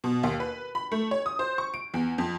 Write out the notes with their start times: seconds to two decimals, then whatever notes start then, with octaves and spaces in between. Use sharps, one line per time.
0.04 B2
0.23 D#2
0.40 B4
0.75 B5
0.92 A3
1.11 C#5
1.26 D#6
1.39 C5
1.58 C#6
1.74 D7
1.94 E2
2.18 F2